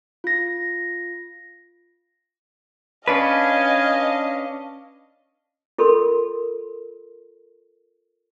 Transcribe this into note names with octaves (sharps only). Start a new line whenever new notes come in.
F4 A#6
C#4 D4 B4 D#5 F5 G#5
F4 A4 A#4 B5 C6